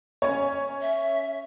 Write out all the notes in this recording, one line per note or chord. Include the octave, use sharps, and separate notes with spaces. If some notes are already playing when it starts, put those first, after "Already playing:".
C#4 C#5
E5